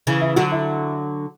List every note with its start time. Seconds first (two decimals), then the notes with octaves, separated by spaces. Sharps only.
0.07 C#3 E3
0.21 E4
0.36 D3 F#3 F#4
0.52 E4